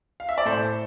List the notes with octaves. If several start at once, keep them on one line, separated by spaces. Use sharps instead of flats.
F5
E5
D5
A2 A4 C5